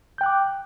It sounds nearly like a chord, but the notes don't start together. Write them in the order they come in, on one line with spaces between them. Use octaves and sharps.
G6 G5 F#6 D6